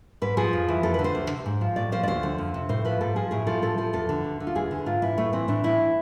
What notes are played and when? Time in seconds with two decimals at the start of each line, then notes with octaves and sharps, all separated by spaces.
0.22 G#2 B4
0.37 F3 G#4
0.53 F2
0.68 E3
0.83 F2 A4
0.94 D3 B4
1.04 C5
1.15 D2
1.30 C3
1.46 G#2
1.61 F3
1.76 A2 D5
1.92 F3 C5
2.03 D5
2.08 D2 C5
2.23 D3
2.38 F2
2.54 C3
2.69 A2 C5
2.85 F3 B4
3.01 G#2 A4
3.16 F3 G#4
3.31 A2 G#4
3.47 F3 A4
3.62 A2 A4
3.78 F3 A4
3.93 E2 A4
4.09 D3
4.24 D2
4.40 D3
4.47 F4
4.55 E2 G#4
4.71 D3
4.86 G#2 F4
5.02 E3 E4
5.18 A2 A3
5.33 E3 C4
5.48 A2 D4
5.64 E3 E4